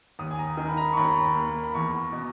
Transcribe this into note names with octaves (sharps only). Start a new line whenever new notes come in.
D#2 D#6
G#5
A#5
D#3 G#5
B5
A#5
C#6
D#2 B5
A#3
B5
E2 C#6
B2